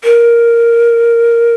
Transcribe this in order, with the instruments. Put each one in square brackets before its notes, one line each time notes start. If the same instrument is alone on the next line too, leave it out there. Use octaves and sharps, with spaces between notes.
[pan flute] A#4